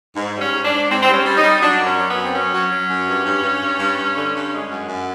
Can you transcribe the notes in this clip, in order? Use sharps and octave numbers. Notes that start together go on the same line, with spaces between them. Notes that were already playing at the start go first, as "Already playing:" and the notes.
G#2
G3
C#4
G#2
D4
G#2
G#2 C4
C4
G3 C#4
G3
D#4
G3
F#3 D4
F#2
C#4
F#3
B3
F#2
C4
F#3 C#4
F#3
F#3
F#2
G2
G2
G2
G2
G2
G2
D3
G2
G#3
F#2
F#2